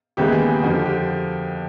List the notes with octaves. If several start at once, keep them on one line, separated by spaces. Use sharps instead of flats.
D#2 C#3 E3 G#3 B3 G4
G#4
G4
F2 D3 F3 F#4
G4
G4